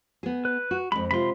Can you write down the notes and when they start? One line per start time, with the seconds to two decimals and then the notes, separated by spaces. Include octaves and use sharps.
0.23 B3 G#4
0.45 B4
0.71 F#4
0.92 F2 G#3 B5
1.11 C3 G#3 F4 B5 C6